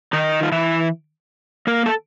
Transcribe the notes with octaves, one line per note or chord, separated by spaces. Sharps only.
D#3 D#4
F4
E3 E4
A#3 A#4
A4